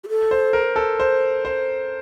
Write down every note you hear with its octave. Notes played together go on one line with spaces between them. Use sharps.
G4
A4
C5
A#4
A4
C5
C5